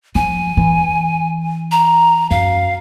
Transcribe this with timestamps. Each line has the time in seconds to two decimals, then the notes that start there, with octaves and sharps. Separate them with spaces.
0.15 F3 G#5
0.57 E3
1.71 A#5
2.31 F#2 F5